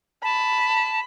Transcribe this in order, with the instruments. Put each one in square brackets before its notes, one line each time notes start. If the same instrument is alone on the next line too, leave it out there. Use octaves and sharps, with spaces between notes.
[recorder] A5 [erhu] B5